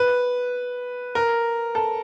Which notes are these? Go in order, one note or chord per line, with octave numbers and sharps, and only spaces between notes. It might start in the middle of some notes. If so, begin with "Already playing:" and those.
Already playing: B4
A#4
A4